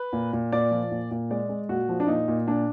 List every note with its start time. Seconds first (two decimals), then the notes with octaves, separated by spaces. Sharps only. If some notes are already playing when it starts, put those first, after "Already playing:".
Already playing: B4
0.13 A#2
0.33 A#2
0.52 A#2 D5
0.71 F3
0.91 A#2
1.11 A#2
1.30 G#3 D5
1.49 G#3
1.69 A#2 F#4
1.89 F3
2.00 D4
2.07 A#2 D#4
2.28 A#2
2.47 A#2 D4